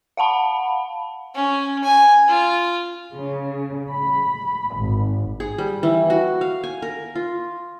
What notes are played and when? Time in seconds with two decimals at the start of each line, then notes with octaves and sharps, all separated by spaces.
0.17 F5 F#5 A5 B5
1.35 C#4
1.84 G#5
2.28 F4
3.14 C#3
3.89 B5
4.76 G#1
5.40 G#4
5.58 G3
5.83 E3
6.10 F#4
6.41 F5
6.64 G#5
6.82 A#4
7.15 F4